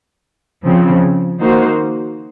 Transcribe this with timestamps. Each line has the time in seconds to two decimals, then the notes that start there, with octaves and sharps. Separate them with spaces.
0.65 C#3 F3 C4
1.39 D#3 A#3 D#4 F#4 C5